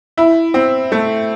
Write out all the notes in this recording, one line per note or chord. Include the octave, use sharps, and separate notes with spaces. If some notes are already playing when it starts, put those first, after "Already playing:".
E4
C4
A3